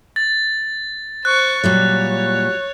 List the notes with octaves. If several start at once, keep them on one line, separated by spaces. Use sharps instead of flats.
A6
C5 C#6 F#6
A#2 F#3 G3 C#5